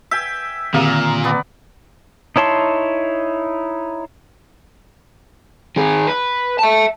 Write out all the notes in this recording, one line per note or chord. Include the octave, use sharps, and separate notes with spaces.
E5 G5 G#5 E6 B6
A#2 D3 D#3 C4 A#4
B3 D5
D#4 E4 C#5 A5 C6
D#3 G#4
B4
E5 A5